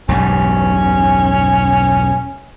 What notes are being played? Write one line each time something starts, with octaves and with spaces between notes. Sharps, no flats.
E1 B1 G2 C#4